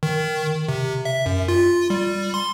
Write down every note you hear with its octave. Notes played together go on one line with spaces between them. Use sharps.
D#3
C3
E5
F#2
F4
G3
C6